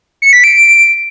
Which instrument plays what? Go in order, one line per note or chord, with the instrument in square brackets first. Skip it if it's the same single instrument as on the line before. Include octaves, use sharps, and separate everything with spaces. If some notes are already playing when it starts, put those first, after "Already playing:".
[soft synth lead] C#7
B6
D7